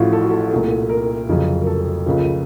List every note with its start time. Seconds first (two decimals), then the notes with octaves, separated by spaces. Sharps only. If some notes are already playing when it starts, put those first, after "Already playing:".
Already playing: A1 A2 F3 A3 F4 F#4
0.13 A4
0.21 F#4
0.31 A4
0.51 C2 A#2 A3
0.89 A#4
1.28 F1 F2 C#3 F#3
1.61 A#4
1.67 A4
2.06 C#2 C#3 F3 A#3